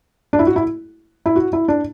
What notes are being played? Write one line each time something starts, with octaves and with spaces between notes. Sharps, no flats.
D4
E4
F#4
E4
E4
F#4
E4
D4